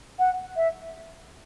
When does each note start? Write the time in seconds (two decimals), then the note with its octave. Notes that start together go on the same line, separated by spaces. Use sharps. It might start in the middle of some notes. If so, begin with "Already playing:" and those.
0.19 F#5
0.56 E5